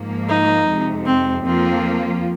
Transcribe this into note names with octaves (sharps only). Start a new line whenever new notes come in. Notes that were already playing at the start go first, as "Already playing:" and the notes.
Already playing: G#2 F3 A#3
D#4
F2 C3 G#3
C4
F2 F3 A#3 C4 F4